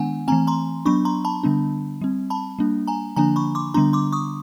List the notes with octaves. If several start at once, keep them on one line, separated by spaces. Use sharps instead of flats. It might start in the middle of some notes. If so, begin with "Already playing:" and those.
Already playing: D#3 G#3 B3 D4 F#5 G#5
E3 A3 C4 G#5 A#5
A#5 C6
F#3 B3 D4 B5 C#6
A#5 C6
A5 B5
D3 G3 B3 D4
G3 C4
A5 B5
G3 A#3 D4
G#5 A#5
D3 F3 A#3 D4 G#5 A#5
B5 C#6
C6 D6
D3 G3 B3 D4 A#5 C6
C6 D6
C#6 D#6